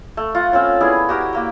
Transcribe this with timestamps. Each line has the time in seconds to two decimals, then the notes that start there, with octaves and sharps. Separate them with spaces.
0.17 A3
0.35 F4 F#5
0.52 C4 C#4 F4 C#5
0.81 B3 E4 G#4 D5
1.09 F#4 G4 A#4
1.33 A#3 G5